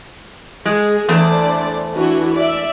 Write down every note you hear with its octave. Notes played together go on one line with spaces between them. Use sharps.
G#3 G#4
E2 D3 A3 C5 D5
E3 D4 F#4
D5 E5